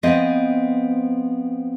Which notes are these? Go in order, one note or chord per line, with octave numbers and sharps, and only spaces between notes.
F3 B3 C4 C5 C#5 D#5